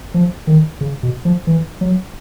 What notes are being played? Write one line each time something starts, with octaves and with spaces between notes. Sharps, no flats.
F3
D#3
C#3
B2
F3
E3
F#3